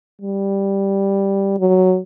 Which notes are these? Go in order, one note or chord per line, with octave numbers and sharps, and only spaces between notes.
G3
F#3